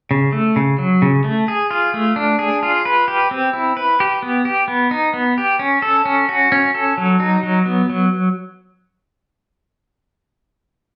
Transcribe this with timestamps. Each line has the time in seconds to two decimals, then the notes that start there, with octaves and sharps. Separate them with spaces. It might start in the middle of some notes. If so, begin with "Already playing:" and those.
0.11 C#3
0.33 A3
0.56 C#3
0.78 F#3
1.02 C#3
1.24 A3
1.48 G#4
1.71 F4
1.94 A3
2.16 D4
2.39 G#4
2.63 F4
2.85 B4
3.08 G4
3.31 C4
3.53 E4
3.77 B4
4.00 G4
4.22 B3
4.45 G4
4.68 B3
4.91 D#4
5.14 B3
5.38 G4
5.59 C#4
5.82 A4
6.05 C#4
6.29 F#4
6.52 C#4
6.75 A4
6.98 F#3
7.20 D#4
7.43 F#3
7.66 B3
7.90 F#3